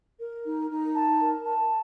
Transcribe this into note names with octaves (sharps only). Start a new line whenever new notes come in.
A#4
D#4
D#4
A5
A#4
A5